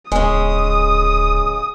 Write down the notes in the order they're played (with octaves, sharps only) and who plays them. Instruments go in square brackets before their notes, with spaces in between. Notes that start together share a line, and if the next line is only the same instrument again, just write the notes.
[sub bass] D1 [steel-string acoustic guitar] C#3 G#3 [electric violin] D#6